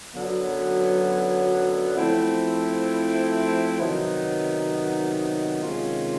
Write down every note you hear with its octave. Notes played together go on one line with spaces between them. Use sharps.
F#2 D3 F#3 B3
F3 A3 C4 E4
C3 D#3 F#3 B3 D#4
C3 D#3 G#3 C#4 F4